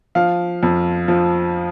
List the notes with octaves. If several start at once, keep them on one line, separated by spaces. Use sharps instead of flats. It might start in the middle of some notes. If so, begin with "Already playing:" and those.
F3 F5
F2
F3